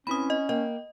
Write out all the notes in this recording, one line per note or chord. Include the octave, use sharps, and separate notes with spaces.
C4 C#4 E4 B4 B5 D#6
D#5
A#3 D#5 G5